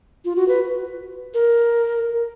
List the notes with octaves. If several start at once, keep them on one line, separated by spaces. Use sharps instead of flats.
F4
F#4
B4
A#4